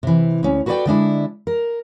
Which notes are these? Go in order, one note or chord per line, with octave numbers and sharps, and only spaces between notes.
C3 E3
D2 C#4
F#4 A4 B4 C5 D5 G5
D3 G#3 D4 E4
A#4